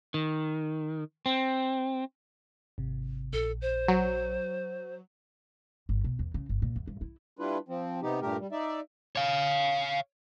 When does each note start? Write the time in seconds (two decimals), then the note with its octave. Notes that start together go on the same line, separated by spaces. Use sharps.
0.14 D#3
1.26 C4
2.78 G#1 C3
3.33 A#1 A4
3.62 C5
3.88 F#3
5.89 G1
6.04 B2
6.19 E2
6.34 C#3
6.49 G1
6.62 A#2
6.76 E2
6.87 G2
7.01 E4
7.39 G3 D4 E4 F4 B4
7.69 F3 C4
8.02 C3 B3 D#4 G4
8.22 G2 A#2 A3 G4 A#4
8.40 G3
8.52 D#4 D5 E5
9.16 C#5 F5